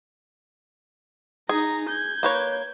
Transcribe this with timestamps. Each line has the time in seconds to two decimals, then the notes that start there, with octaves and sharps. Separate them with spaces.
1.49 D#4 G#4 A#5
1.89 G6 G#6
2.23 A#3 B4 C#5